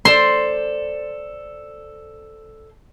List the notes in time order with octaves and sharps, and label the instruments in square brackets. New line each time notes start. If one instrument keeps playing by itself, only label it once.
[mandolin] A4 C5 D5 [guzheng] C6